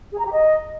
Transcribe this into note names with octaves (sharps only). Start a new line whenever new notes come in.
G#4
A#5
G4
D#5